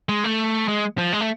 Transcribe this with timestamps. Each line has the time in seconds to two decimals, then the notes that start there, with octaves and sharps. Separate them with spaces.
0.09 G#3
0.24 A3
0.68 G#3
0.98 F3
1.13 G#3
1.21 A3